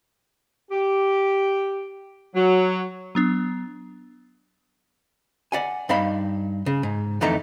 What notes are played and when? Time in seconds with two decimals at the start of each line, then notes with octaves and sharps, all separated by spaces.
0.71 G4
2.35 F#3
3.15 F#3 B3 D4
5.52 D5 F#5 G#5
5.89 G2 D#4 D#5 F5 B5
6.66 C#3
6.83 G#2
7.21 F2 D3 E3 A3 D#4 A#5